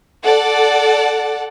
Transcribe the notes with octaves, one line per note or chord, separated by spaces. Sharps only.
A4 D5 F#5